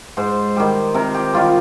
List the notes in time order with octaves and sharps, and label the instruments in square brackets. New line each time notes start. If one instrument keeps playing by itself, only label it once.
[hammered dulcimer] G#2 C5
D#3 G3
C3 A#4
G4
D#3 G3 F4